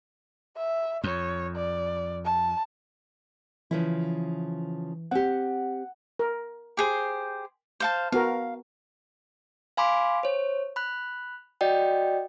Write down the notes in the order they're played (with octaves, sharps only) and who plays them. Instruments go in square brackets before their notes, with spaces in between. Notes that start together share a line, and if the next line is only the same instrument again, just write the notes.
[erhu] E5
[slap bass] F2 [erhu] C#5
[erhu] D5
A5
[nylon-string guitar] C#3 F3 E4 [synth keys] E3
[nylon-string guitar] C4 G4 [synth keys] F#5
[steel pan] A#4
[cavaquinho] G4 G#4 C5
C5 F5 A5
[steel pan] B3 F#4 A#4 [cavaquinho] F5
[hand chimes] F5 G#5 B5 C6 D6
C5 C#5
B5 F#6
F#4 D5 D#5 G5